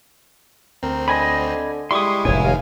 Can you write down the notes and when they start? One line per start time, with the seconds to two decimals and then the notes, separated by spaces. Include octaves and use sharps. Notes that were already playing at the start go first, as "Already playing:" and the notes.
0.83 D2 C4 A#4
1.08 D3 D#5 G#5 B5
1.91 G3 G#3 E4 C6 C#6 D#6
2.25 F1 A2 C#5 G#5
2.44 D#2 D#3 F5